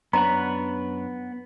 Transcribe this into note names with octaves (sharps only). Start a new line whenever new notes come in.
F#2 B3 D4 B4 C#5 F#5 A#5